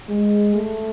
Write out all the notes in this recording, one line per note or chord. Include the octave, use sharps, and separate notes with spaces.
G#3
A3